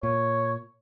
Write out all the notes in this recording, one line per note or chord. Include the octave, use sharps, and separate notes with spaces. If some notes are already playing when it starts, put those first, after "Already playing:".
A#2 C#5